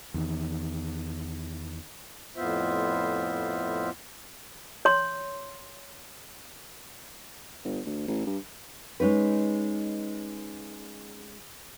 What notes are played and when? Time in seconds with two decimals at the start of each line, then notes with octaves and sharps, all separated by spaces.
0.14 E2 D#3
2.36 F2 A2 B3 F4 C5 E5
4.85 C#5 C6
7.64 G1
7.86 D2
8.08 A1
8.27 G2
9.00 G#3 C#4 D#4 B4